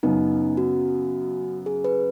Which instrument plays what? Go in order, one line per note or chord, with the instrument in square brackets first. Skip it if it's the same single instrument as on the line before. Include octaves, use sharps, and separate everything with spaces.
[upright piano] F#2 C#3 B3 [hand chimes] D#4
[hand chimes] F#4
G#4
B4